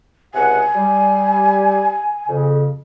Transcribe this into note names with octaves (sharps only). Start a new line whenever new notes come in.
C#2 C3 F#5 G#5
G3
F2 C#3